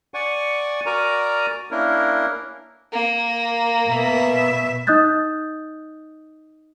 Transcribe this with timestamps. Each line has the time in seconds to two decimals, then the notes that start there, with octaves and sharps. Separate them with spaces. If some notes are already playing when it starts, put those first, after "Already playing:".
0.14 D5 F#5 G#5 C#6
0.86 F#4 A#4 D5 G#5 A#5
1.71 A#3 C#4 D4 E4 A#4
2.93 A#3
3.89 B2 E5
4.87 D#4 D#5 D#6 F#6 G6 A6